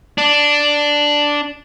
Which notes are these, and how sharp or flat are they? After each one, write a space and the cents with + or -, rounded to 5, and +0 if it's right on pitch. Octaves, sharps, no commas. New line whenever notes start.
D4 +0